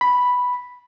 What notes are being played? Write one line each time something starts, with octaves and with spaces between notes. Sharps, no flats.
B5